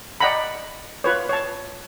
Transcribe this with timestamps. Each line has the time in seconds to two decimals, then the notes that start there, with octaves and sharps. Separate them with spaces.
0.20 D5 D#5 F#5 G5 A#5 B5
1.04 F4 B4 C#5
1.29 C#5 A5